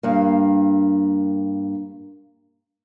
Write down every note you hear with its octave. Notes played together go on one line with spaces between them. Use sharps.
G2 A#3